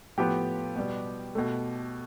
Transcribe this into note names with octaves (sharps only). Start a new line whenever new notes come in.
A2 F3 B3 G4 G5
B2 G3 B3
B2 A3